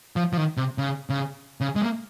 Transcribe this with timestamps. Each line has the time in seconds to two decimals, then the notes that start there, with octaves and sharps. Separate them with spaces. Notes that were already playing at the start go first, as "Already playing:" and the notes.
0.16 F3
0.33 F3
0.37 D#3
0.57 C3
0.78 C#3
1.10 C#3
1.61 C#3
1.76 G#3
1.81 A#3